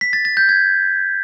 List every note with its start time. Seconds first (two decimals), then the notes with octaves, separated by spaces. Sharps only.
0.01 B6
0.13 A6
0.25 A6
0.37 G6
0.49 G#6